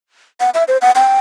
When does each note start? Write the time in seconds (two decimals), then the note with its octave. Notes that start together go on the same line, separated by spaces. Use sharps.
0.40 F#5
0.54 E5
0.68 C5
0.82 F#5
0.96 G5